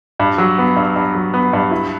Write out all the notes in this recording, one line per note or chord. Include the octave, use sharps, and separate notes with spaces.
G2
F#3
B3
G2
G2
F#3
B3
G2
E4